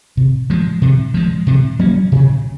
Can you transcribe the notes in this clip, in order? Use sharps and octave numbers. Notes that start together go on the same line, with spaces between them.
C3
F3 G#3
C3
F3 G#3
C3
F#3 A#3 C#4
C3